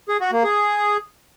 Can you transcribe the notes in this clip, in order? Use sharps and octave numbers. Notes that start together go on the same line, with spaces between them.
G#4
F#4
A#3
G#4